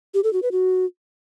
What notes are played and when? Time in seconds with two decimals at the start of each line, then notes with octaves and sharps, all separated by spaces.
0.14 G4
0.24 A4
0.33 F#4
0.42 B4
0.52 F#4